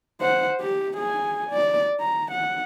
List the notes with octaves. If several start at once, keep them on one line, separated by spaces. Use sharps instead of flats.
C5 F#5
G4
G#4 G#5
D5
A#5
F#5